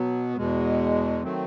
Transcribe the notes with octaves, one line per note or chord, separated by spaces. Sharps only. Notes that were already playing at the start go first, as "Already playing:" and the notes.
Already playing: B2 F#3 B3
E2 B2 G#3
D#3 F#3 A3 C4